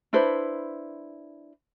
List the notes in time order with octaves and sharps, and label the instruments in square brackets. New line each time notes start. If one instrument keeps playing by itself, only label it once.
[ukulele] D4 E4 B4 C5